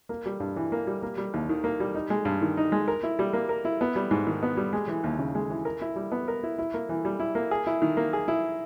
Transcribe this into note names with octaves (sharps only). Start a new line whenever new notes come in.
A#3
G3
G2
E3
A#3
G3
A#3
G3
D#2
D#3
A#3
G3
D#4
G#3
G2
D#3
D#4
G#3
A#4
E4
G3
A#3
A#4
E4
B3
G3
G#2
D#3
B3
G3
G#3
E3
D#2
C#3
G#3
E3
A#4
E4
G3
B3
A#4
E4
E4
A#3
E3
G3
E4
A#3
G#4
E4
D#3
A#3
G#4
E4